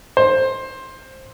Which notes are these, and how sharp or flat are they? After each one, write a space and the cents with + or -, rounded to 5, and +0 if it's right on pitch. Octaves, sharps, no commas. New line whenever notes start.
C5 +15